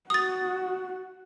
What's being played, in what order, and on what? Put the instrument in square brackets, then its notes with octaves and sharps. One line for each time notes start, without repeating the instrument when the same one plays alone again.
[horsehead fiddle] F#4 [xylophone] D#6 A6